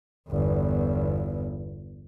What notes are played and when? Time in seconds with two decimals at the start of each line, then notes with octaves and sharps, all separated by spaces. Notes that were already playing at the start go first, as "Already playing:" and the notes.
0.29 G1 E2